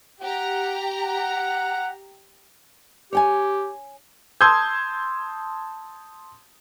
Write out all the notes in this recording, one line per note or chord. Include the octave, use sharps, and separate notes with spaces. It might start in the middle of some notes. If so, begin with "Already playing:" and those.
G4 F#5 A#5
F#5
G4 C#5 G5 G#5
A5 C6 D#6 E6 G6 G#6